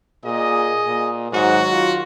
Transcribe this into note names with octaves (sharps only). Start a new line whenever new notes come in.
A#2 G#4 D#5
A#2
G#2 D#3 F#3 F#4
F4